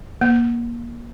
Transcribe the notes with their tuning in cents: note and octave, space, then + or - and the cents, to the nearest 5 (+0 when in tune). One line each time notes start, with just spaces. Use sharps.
A#3 +25